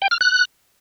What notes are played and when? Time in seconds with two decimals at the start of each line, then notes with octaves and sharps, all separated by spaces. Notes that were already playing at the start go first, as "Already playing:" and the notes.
0.02 G5
0.11 F6
0.21 F#6